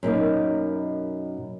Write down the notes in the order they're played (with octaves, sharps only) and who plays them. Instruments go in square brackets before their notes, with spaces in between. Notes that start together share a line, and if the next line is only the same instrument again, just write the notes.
[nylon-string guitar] F#2 B2 A#3 D#4